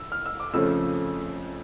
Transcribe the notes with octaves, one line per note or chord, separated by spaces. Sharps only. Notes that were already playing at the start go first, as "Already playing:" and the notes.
Already playing: E6
F6
E6
D6
F2 C#3 F3 A3 C#4 E6